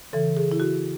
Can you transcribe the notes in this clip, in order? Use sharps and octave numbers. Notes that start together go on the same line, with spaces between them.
C#3 E3 A4
G#4
E4
F#4